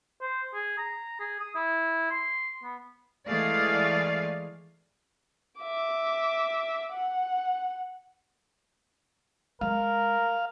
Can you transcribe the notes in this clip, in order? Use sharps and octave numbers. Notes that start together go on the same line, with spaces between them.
C5
G#4
A#5
G#4
D#6
E4
C6
B3
E3 G#3 A3 G#4 D5 F5
E5 D6
F#5
G#3 A#4 F5